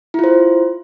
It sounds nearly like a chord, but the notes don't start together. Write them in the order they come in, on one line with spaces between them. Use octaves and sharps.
E4 F4 C5